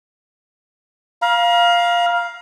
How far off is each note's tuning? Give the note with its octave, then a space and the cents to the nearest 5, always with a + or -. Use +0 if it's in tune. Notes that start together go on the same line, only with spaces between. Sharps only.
F5 +0 A#5 +40